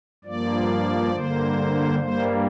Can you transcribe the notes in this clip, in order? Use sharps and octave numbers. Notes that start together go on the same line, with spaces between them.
G2 F3 A#3 D5
G2 D3 A#3 C5
G2 G3 A#3 C5